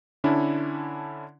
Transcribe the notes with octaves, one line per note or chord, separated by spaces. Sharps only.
D3 C#4 D4 E4